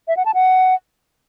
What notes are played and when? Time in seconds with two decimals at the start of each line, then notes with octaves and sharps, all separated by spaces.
0.08 E5
0.17 F#5
0.26 A5
0.34 F#5